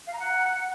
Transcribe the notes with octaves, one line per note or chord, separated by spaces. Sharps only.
F5
A#5
F#5